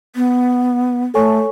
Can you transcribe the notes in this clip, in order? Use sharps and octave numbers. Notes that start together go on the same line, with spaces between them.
B3
A3 A4 C#5 G#5 C#6